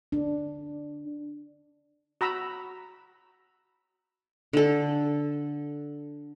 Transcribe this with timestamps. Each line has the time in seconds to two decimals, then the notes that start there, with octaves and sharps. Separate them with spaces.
0.12 D4
2.21 F#4 A#5 B5 E6
4.53 D3 A4